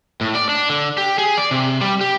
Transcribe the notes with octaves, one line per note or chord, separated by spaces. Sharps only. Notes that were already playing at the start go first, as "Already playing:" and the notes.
A2
D5
D4
D3
G4
G#4
D5
C3
G3
G4